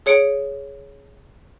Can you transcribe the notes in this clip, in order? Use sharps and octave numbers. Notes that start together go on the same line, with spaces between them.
G#4 C#5 C#7 D7